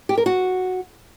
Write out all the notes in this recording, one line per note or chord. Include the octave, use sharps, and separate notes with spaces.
G4
A#4
F#4